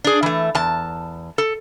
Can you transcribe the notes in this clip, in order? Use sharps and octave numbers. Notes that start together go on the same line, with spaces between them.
D4 G#4
E3 A3
E2 A5
A4